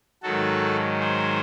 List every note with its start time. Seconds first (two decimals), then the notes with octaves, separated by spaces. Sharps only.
0.23 G#2 D#3 F#3 F#4 A4
1.00 G#4 C5